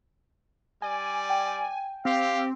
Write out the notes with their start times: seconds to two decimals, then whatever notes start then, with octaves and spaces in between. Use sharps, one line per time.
0.82 G3 D5 G#5
1.30 G5
2.05 C4 G4 F5